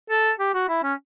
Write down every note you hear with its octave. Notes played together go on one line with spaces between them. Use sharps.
A4
G4
F#4
E4
C#4